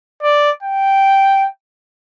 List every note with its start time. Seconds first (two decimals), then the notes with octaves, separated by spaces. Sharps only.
0.23 D5
0.63 G5